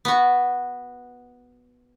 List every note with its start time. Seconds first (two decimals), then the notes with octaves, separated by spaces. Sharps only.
0.05 B3 F#4